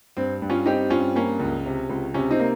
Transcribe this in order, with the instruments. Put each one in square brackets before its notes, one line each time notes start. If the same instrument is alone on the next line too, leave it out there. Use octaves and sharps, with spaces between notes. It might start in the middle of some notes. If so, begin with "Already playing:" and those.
[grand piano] G2 [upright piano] C4
[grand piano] G2
[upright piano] C#4 F4
[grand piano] C4 [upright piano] D#4 G4
[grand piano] G2 [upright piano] C#4 F4
[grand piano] A#3 [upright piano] C#4
[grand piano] C#2
C3
C#2
[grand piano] C3 [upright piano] C#4
[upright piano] C4 D#4
[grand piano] A#3